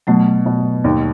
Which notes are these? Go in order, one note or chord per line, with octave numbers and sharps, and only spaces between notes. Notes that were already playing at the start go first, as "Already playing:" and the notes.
B2 F#3 A3
B2
D#2